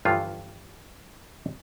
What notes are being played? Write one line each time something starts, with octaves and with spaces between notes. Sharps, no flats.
G1 G2 E3 F3 F4